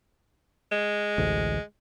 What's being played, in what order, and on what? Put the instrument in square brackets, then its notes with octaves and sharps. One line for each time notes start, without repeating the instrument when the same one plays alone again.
[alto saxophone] G#3
[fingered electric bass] A1 D2